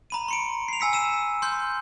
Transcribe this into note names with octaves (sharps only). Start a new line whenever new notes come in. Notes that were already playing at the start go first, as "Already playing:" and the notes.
A#5 B5 D#7
C6 C#7 D7
C7 F7
G#5 E6 B6 C#7
E6 D#7 E7
C6 F6 G6